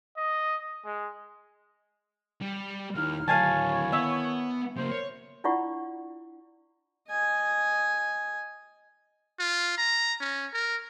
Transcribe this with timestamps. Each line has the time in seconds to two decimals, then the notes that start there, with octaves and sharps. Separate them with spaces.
0.17 D#5
0.85 G#3
2.41 G3
2.95 D#2 D#4 E4 F6
3.28 D2 D#3 F#3 E4 C#5 F5 G#5 A5
3.92 B3 E5
4.77 C#3 A#3 A#4 C5
4.92 C#5
5.44 D4 E4 F4 D5 F#5 C#6
7.09 D#5 G#5
9.39 F4
9.78 A#5
10.21 C#4
10.53 A#4